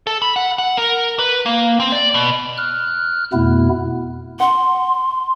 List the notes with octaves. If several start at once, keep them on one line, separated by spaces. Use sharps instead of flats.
A4
B5
F#5
F#5
A#4
B4
A#3
C4
D5
B2
F6 F#6
F2 B2 A3 B3 E4
F#5 C6